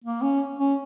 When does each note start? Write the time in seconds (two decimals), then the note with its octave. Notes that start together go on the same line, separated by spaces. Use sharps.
0.04 A#3
0.22 C#4
0.59 C#4